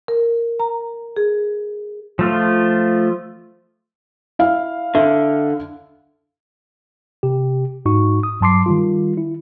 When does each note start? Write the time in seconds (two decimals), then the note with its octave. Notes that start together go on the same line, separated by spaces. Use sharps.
0.08 A#4
0.60 A#5
1.16 G#4
2.19 F3 A3 F4
4.39 E4 F5
4.95 D3 E5
7.23 C3 G4
7.86 G#2 D#4 F#4 C#6
8.23 D#6
8.41 G2 F#3 A5 C6 D6 C7
8.66 D#3 G3 F4
9.17 E4